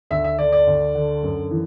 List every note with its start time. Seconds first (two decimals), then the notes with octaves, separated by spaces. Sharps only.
0.10 D2 E5
0.24 E5
0.38 D3 D5
0.52 D5
0.67 D2
0.95 D3
1.23 F#2
1.51 E3